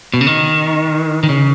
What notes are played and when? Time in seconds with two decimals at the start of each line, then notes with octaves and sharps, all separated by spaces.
0.14 B2
0.21 C#3
0.27 D#3
1.23 D#3
1.29 C#3